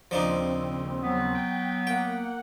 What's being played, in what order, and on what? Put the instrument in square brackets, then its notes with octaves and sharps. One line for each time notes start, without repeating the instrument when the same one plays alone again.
[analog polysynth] D#2 C#3 C4 [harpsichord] F3 D4 D#4
[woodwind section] F#3 B3
[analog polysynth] G5
[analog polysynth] A#3 F#5 [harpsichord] G5